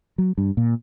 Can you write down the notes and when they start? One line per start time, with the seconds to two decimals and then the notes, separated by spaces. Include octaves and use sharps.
0.18 F#3
0.38 G2
0.57 A#2